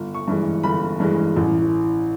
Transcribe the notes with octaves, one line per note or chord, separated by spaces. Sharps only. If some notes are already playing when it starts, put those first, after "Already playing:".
Already playing: G1
C#6
G2 E3 G#3
G1 B5
G2 E3 G#3
A1